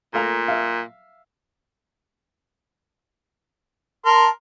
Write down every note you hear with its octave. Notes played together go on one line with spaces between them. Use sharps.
A#2 A3 F5 A#5
E5 F5
A#4 A5 C6